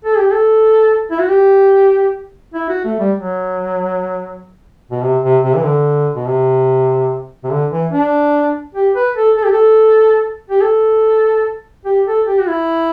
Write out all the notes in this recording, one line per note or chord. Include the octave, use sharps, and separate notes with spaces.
A4
G4
A4
E4
F#4
G4
E4
F#4
A3
G3
F#3
B2
C3
C3
C3
E3
D3
B2
C3
C3
D3
E3
D4
G4
B4
A4
A4
G4
A4
G4
A4
G4
A4
G4
F#4
E4